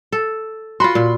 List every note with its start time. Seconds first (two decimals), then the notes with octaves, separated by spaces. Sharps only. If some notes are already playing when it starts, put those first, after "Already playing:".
0.12 A4
0.80 F4 F#4 B5 C6
0.95 A#2